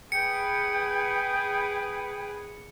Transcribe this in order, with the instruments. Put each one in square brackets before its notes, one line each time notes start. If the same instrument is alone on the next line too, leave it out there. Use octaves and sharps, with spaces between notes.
[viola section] G#4 B4 [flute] G5 [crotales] C#7